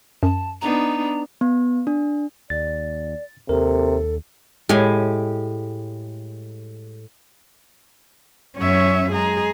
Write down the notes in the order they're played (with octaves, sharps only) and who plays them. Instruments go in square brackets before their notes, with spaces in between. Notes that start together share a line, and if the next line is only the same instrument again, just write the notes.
[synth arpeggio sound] F#2 [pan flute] A5
[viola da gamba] B3 D4 D#4 [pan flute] A#5
[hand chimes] B3
D4
[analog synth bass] D#2 [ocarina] D5 [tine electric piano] A6
[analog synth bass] D#2 [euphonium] C3 [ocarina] A4 [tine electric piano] A#4
[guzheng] A2 G#5 [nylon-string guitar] G#3 G4
[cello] F#2 C#4 [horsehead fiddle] C#5 E5
[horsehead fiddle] G#3 A#5 [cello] G#4